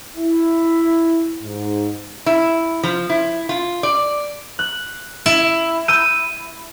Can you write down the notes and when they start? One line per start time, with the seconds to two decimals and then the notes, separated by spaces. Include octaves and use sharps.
0.16 E4
1.43 G#2
2.26 E4
2.83 F3
3.10 E4
3.49 F4
3.83 D5
4.59 F#6
5.26 E4
5.88 E6 G6 D#7